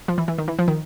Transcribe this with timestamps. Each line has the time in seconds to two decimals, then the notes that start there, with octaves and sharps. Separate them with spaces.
0.08 F3
0.18 E3
0.28 E3
0.38 D#3
0.48 E3
0.59 F3
0.68 D#3